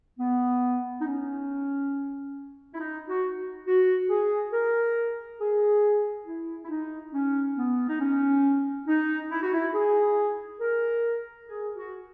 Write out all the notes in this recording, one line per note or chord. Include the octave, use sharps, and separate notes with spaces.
B3
D#4
C#4
E4
D#4
F#4
F#4
G#4
A#4
G#4
E4
E4
D#4
C#4
B3
D#4
C#4
D#4
E4
F#4
E4
G#4
A#4
G#4
F#4